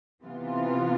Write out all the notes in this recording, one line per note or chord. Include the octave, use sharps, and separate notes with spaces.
C3 E3 B3 F4